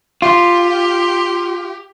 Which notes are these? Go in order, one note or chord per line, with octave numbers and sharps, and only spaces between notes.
F4 G4